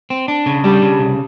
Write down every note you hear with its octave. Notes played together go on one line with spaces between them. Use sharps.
C4
D4
C#3
G3 D4
C#3
C2